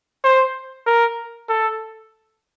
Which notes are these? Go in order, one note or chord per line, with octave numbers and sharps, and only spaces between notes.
C5
A#4
A4